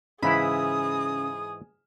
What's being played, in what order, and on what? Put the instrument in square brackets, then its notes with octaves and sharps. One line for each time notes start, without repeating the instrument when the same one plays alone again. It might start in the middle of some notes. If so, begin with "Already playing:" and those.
[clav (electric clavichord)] G#2 E3 E4 [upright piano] C#3 [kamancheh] G#4 D#6 [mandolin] B5